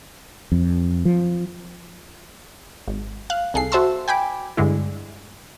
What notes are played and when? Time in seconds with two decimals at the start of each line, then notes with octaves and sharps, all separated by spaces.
0.52 F2
1.05 F3
2.88 G#1
3.30 F5 F#6
3.54 C2 G#4 A4 C7
3.72 F#4 C5 E5 A5 C6 E6
4.08 G5 G#5 B5 D6
4.57 G2 D3 G#3 E4